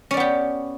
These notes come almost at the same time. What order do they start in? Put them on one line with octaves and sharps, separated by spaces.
C#4 D5 B3 G4